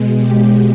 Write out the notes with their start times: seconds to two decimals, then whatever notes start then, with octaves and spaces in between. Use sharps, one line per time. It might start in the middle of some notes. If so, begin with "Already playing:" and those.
Already playing: B2 G#3
0.18 G4